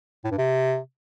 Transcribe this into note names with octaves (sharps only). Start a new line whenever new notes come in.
A2
G2
C3